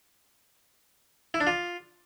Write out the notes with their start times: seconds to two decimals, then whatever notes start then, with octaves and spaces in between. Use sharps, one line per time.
1.34 E4
1.41 D4
1.47 F4